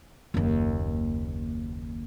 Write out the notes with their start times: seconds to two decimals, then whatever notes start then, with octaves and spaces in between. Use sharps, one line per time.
0.34 F#1 D#2